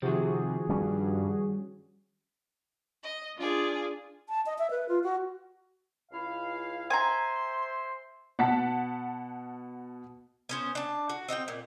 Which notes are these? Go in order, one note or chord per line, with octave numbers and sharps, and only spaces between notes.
C3 D#3 F3 F#4 G#4
G2 G3 C#4
D#5
D4 F4 G#4 D5
A5
D#5
E5
B4
F4
F#4
C#2 E4 F5
C5 E5 G#5 A#5 C6
B2 F#5 A5 B6
B3 C#4 C5
D4 A5
F#4
C4 D#4 F#5 G5
A#2